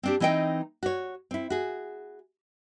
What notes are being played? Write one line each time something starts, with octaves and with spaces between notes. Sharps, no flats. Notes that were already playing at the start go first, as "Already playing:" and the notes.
C4 D4 G4
E3 C4 D#4 D#5 G5
F#4 C#5
C4 E4
F#4 G#4